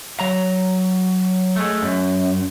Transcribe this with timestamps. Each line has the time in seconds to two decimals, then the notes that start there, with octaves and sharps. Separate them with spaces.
0.20 F#3 A#5
1.56 G#3 A3
1.82 F#2